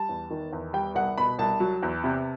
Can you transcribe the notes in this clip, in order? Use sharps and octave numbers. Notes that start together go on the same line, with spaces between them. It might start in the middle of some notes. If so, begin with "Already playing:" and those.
Already playing: G3 A5
E2
D#3
E2
G3 G5
C2 F#5
B2 B5
C2 A5
F#3
E2
C3